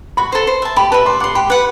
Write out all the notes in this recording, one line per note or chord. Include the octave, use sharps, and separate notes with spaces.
F#4 B5
A4 C5
C5
E5 A5
G4 B5
B4 E5 A5
D5 C6
F#5 C6 D6
G4 B5
B4 F#5